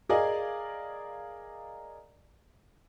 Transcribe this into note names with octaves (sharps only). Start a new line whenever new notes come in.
G#4 A#4 D5 D#5 F5 G#5